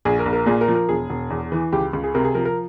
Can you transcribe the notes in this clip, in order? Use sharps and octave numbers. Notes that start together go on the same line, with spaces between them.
A#1 G#4
A#4
A#1
A#4
A#2 G#4
A#4
F3
A#4
E1 G#4
E1
E2
E3
C#2 G4
C#2
G#4
C3 A#4
G#4
F3 A#4
A#4